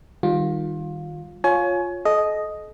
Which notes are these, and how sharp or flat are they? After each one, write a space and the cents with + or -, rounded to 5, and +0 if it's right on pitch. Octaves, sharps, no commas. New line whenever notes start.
D#3 -5 G3 +0 F4 +20
F4 +15 C#5 +0 G#5 +25
A4 -40 D#5 +0